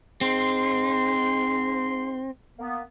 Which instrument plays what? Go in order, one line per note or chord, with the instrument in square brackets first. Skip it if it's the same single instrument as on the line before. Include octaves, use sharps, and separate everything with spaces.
[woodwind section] G#2 C6 [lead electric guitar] C4
[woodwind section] A#3 B3